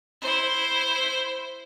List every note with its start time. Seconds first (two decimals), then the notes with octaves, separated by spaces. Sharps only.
0.21 E4 C5